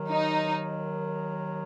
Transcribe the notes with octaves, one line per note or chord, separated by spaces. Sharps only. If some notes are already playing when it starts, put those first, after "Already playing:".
Already playing: D#2 D#3 F#3
D#4